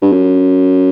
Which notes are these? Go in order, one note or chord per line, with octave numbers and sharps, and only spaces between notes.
G2
F#2